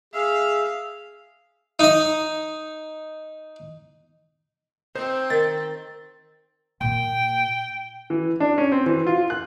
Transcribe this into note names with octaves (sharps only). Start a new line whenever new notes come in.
G#4 E5 F5
D#4 D#5
C4 D#4 C5
D#3 A6
A#2 A#3 G5
E3
D4
C#4
C4
E3
F4
F#6